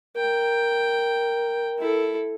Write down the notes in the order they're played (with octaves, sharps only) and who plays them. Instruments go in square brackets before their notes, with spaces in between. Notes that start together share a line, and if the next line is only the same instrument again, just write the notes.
[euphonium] A#4 [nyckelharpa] G5
[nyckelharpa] E4 A4